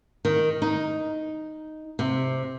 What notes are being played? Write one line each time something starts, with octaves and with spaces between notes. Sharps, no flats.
D#3
D#4
C3